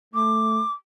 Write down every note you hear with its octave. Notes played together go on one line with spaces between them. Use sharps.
A3 D6